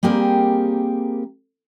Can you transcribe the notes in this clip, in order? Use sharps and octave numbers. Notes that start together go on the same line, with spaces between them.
G3 A#3 C4 G4 G#4 A#4